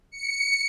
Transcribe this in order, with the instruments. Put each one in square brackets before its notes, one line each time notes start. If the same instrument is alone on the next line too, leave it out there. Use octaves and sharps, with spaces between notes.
[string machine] C#7